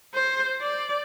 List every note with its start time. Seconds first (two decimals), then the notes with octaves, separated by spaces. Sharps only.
0.14 C5
0.61 D5